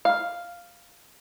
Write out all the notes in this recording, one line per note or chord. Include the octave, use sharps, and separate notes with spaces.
F5